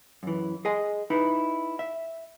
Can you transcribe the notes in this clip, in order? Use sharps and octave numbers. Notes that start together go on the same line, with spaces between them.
F#2 E3
G#4 D#5 G#5
D#4 E4 B4
E5